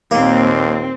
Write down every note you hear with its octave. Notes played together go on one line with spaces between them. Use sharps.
D#2 A#2 A#3 C4